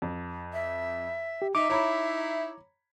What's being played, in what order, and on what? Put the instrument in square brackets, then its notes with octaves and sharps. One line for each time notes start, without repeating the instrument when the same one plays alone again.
[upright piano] F2
[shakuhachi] E5
[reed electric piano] G4
[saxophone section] D#4 [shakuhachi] E5 [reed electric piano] D6
[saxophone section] D#4 E4 [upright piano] C#5 A#5 B5